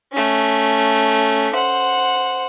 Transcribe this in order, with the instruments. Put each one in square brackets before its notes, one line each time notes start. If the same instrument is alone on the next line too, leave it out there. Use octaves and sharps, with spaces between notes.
[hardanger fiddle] A3 C#4
C5 F#5